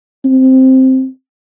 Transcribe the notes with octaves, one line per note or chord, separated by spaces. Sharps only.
C4